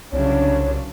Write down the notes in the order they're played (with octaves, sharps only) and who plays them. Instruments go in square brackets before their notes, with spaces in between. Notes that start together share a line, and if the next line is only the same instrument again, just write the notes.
[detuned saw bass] C2 [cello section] C#3 F#3 D4 [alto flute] C#5